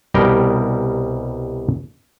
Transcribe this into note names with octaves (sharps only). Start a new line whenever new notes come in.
C2 B2 G3 A#4 G5 A#5